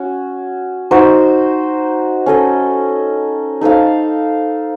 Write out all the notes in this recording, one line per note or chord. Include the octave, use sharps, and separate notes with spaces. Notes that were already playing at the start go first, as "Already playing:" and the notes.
Already playing: C#4 F#4
D#4 F#4 C5
C#4 A4 D#5
D#4 A4 C5 F5